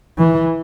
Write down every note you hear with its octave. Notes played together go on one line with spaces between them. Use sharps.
E3